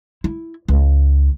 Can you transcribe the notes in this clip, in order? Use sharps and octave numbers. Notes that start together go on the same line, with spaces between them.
E4
C#2